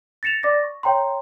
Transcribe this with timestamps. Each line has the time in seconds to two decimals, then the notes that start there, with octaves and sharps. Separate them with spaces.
0.23 A6 A#6 C#7 E7 F7
0.43 D5 D6 A6 A#6
0.63 C#6
0.83 C#5 G5 A#5 C6